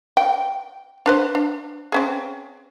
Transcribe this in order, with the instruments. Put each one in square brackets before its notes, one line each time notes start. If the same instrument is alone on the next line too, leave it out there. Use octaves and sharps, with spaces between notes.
[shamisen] G5
D4 B4 C5
D4
C4 C#4 G#4